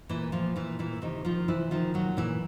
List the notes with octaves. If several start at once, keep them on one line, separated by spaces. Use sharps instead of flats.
A#2 E3 E4
A#2 F3 F4
A#2 E3 E4
A#2 E3 E4
C3 D#3 D#4
D#3 F3 F4
C3 E3 E4
D#3 F3 F4
A#2 F#3 F#4
A#2 E3 E4